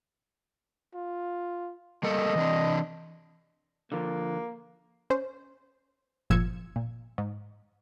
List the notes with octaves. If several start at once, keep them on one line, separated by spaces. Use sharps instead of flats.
F4
G3 A#3 A4 D#5
E3 C4 D4
D3 F3 A#3
C#4 C5
G1 A#2 F3 E6 G#6 C#7
A#2
G#2